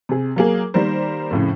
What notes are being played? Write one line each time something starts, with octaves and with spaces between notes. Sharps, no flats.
C3 G#4
F#3 A#3 G#4
D#3 G3 A#3 A#4 C5
F2 A2 C#3